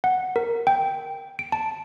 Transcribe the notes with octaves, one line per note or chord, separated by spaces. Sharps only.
F#5
A#4
G5
D7
A5